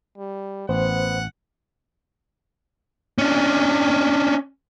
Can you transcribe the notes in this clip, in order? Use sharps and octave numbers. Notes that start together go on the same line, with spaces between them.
G3
A1 B3 C5 F#5
C#4 D4